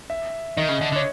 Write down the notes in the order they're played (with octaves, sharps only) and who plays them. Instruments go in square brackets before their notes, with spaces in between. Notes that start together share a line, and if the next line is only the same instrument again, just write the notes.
[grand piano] E5
[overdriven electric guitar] D#3 [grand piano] D#5
[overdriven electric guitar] C#3
D3
D3
[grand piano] C#5